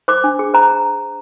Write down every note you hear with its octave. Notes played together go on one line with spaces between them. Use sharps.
C5 D6
D4
G#4
C5 A#5